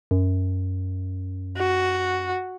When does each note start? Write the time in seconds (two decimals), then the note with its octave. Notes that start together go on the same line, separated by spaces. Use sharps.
0.11 F#2
1.57 F#4